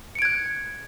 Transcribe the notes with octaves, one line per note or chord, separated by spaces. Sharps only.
F#6 G#6 C#7 D7